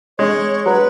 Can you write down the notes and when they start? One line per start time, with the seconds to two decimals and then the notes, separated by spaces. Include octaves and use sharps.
0.18 G#3 C#5
0.66 F#3 B4